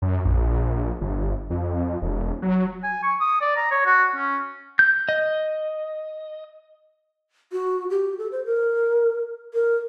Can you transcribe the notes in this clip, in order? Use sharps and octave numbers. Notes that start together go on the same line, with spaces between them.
F#2
A#1
G1
F2
E1
F#3
G#5
C#6
D#6
D5
A#5
C#5
F#4
C#4
G6
D#5
F#4
G4
A4
C5
A#4
A#4